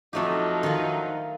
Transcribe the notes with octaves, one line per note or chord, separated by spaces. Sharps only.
F2 F3 F#3 A3 D#4 G4
D#3 F4